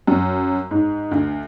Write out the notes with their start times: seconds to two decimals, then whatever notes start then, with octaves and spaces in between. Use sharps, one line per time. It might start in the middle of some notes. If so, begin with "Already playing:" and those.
0.07 F#2
0.71 G#2
1.11 D2